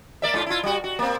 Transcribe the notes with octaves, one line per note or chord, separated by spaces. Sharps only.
A#3 D5 E5
G#2 F4
E4 F4
G3 F#4
F#4
A#3 C4